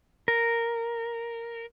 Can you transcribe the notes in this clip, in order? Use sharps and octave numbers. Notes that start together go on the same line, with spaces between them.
A#4